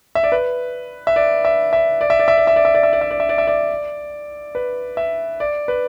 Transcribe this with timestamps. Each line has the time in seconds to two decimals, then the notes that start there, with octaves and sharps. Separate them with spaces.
0.15 E5
0.24 D5
0.32 B4
1.07 E5
1.16 D5
1.45 E5
1.73 E5
2.01 D5
2.10 E5
2.19 D5
2.28 E5
2.38 D5
2.47 E5
2.56 D5
2.65 E5
2.75 D5
2.83 E5
2.93 D5
3.01 E5
3.11 D5
3.20 E5
3.29 D5
3.38 E5
3.47 D5
4.55 B4
4.97 E5
5.40 D5
5.68 B4